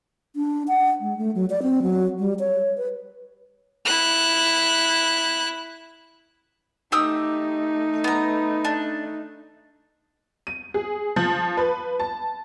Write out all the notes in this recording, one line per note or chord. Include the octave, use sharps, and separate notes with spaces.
D4
F#5
G#3
A3
F#3
D5
C4
F#3
G3
C#5
B4
E4 F#6
A3 D#4 G4 D#6 E6
B3 A#5
D4
D#7
G#4
F3
B4
A5